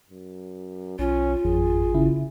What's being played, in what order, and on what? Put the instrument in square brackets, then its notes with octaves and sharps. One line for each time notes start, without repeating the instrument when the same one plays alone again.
[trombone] F#2
[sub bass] B1 [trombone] C#4 [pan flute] F4
[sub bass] G#1 [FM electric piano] F2 [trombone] G#4
[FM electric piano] C#3 E4